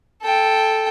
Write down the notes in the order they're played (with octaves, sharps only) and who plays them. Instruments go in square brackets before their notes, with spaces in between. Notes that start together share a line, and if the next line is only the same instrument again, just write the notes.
[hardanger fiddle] A4 G5